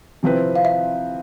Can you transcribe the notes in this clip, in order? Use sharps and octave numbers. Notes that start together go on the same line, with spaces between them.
C3 F3 C4 E4 B4
F5
E5